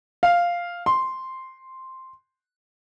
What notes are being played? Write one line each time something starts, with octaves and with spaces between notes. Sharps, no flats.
F5
C6